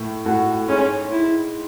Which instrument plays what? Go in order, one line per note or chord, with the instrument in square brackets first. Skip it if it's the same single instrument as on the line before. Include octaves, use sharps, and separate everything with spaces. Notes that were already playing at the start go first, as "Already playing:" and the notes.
Already playing: [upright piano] A2
[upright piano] A2 [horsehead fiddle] F#4
[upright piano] G#2 [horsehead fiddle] C#4
[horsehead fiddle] E4